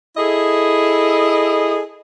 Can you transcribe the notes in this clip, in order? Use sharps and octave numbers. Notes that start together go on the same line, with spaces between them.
E4 G#4 A4 D#5